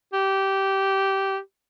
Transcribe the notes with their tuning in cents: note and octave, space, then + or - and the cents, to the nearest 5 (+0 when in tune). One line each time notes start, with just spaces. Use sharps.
G4 -15